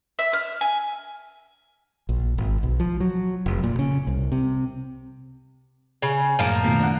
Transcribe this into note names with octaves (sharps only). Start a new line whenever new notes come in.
E5
F6
G#5
A#1
G#1
B1
F3
F#3
F1
A#2
C#3
C2
C3
C#3
F#2 A2 F3 A#3 A5
B2 D#3 A3
D4 F#5